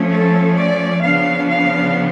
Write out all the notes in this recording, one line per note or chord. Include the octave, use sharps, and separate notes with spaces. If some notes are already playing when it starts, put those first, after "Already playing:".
Already playing: F3 A3 C#4
A4
D5
C#3 F3 B3 D4 F5
F5